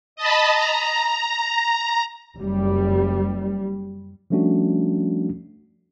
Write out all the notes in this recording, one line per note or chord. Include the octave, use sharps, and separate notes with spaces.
D#5 A5 B5
A#5
F#1 G3
F3 G3 A3 C#4 D4 F#4